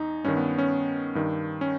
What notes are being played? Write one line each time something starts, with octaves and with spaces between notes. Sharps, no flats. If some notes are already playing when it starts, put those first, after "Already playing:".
Already playing: E2 D#4
G2 D#3 C#4
B3
C#4
G2 D#3
C#4